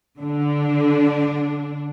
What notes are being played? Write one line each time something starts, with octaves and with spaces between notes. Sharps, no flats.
D3 D4